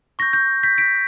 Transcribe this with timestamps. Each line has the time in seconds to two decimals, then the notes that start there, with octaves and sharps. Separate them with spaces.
0.19 C#6 A#6
0.22 G6
0.33 G6
0.63 G6 B6
0.78 B6 D7